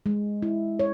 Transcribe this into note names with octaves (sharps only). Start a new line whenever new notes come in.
G#3
E4
C#5